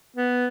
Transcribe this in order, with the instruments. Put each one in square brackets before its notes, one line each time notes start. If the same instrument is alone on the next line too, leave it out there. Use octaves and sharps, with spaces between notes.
[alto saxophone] B3